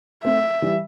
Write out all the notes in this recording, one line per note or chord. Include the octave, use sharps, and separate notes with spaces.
A3 C4 E5
E3 G3